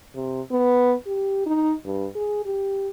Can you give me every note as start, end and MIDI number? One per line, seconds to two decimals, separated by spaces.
0.15 0.41 48
0.51 0.94 59
1.06 1.43 67
1.46 1.74 63
1.85 2.07 43
2.15 2.43 68
2.45 2.88 67